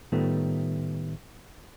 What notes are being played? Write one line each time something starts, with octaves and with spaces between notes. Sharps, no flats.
A2 D#3 G3 A3 B3 F4